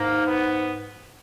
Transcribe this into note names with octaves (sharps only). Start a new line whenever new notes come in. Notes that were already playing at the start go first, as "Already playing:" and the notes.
Already playing: G#2 A#3
B3